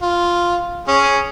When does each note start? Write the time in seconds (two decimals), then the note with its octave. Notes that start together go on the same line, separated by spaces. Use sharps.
0.02 F4
0.88 C#4 G#4